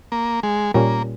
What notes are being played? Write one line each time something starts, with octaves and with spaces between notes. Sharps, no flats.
A#3
G#3
A#2 G3 A#3 C#4